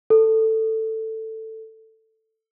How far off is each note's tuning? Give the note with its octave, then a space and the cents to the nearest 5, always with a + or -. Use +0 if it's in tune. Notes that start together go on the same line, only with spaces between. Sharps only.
A4 +10